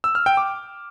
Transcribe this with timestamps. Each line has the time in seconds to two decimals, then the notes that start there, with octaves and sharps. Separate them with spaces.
0.04 E6
0.15 F6
0.26 G5
0.37 D6